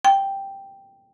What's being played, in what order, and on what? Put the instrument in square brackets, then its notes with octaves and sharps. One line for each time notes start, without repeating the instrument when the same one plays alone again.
[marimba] G5